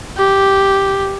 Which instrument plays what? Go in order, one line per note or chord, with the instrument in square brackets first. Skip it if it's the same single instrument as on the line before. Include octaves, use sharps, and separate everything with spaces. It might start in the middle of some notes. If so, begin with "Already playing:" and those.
[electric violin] G4